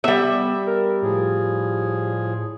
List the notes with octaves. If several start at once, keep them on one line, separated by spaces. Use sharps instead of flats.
G3 B3 E5
A#4
A2 F3 G#4